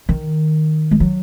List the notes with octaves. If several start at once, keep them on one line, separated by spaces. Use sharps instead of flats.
D#3
G#3
F#3